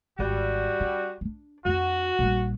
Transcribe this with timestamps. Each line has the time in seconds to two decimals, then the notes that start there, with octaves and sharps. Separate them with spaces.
0.19 G#1 G3 F#4
0.80 C#4
1.21 C#4 D4
1.65 F2 D4 F#4
2.19 A#1 G3